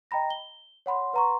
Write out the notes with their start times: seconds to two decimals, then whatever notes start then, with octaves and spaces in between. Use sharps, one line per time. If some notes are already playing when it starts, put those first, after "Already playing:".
0.11 D#5 G5 A#5 B5 A#6
0.30 G7
0.86 C#5 F#5 B5 C6
1.14 B4 F#5 A#5 C6 C#6